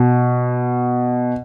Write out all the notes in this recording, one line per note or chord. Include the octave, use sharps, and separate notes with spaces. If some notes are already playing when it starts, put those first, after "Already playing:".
Already playing: B2